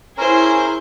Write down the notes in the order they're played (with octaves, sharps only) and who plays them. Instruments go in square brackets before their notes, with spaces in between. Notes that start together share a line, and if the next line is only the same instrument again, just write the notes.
[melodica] C#4 A#4 [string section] E4 G#4 C5